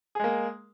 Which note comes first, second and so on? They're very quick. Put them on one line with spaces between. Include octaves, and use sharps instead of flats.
G#4 G#3 A#3